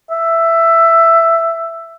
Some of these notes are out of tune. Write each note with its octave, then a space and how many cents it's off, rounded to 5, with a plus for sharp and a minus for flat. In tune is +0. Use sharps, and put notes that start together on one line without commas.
E5 +10